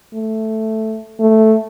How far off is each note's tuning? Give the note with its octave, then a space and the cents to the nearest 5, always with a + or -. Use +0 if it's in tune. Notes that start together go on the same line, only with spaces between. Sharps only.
A3 +0
A3 +0